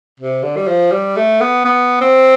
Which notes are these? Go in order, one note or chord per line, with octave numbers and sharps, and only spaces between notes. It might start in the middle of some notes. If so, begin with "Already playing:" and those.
C3
D3
G3
F3
G3
A3
B3
B3
C4